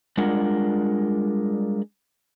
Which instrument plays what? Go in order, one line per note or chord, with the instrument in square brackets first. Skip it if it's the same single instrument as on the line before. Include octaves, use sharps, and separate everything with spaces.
[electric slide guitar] G3 G#3 D4 F4 A#4 F#5